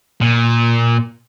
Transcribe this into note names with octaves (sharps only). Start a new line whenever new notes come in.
A#2